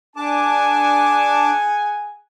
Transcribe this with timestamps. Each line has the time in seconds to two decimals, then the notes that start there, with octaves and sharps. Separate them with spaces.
0.16 D4 G#4 F#5 G#5 A5 D6